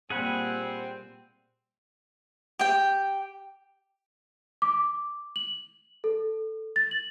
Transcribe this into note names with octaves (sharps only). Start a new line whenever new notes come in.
A#2 G3 A#3 C4 G#4 F#5 B5
G4 G5
D6
F#7
A4
A6
F#7